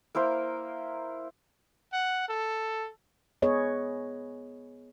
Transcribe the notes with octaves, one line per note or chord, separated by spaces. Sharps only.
A#3 E4 A#4 C5
F#5
A4
B3 G#4 B4 C#5 D#5